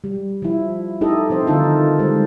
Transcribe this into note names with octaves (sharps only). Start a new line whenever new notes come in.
G3
F3 E4
D#4 E4 G4 A4 D#5
F3 C4 C5
D3 D#3 D#4 F4 A4
G3 G#3 C5